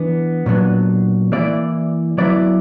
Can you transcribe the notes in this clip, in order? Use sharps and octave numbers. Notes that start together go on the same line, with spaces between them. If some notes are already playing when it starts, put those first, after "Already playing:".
Already playing: E3 B3 D4
A#2 F#3 B3 D4
E3 A#3 E4 D5
F#3 B3 E4 D5